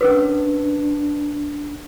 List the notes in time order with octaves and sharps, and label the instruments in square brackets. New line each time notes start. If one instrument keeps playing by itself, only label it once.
[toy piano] C#4 A#4 B4 [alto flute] D4